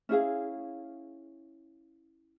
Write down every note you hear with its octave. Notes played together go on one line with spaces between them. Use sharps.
C#4 E4 G#4 F5